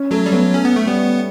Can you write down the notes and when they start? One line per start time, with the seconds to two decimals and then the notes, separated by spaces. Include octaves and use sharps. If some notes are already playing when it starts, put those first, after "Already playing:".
Already playing: C#4
0.11 F#3 A3
0.26 G3
0.32 F#3 B3
0.54 A3 C#4
0.65 B3
0.76 A3
0.86 G3 B3